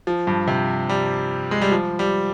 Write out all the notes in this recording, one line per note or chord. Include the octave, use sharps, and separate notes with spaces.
F3
G2
C3
G3
G#3
G3
F3
G3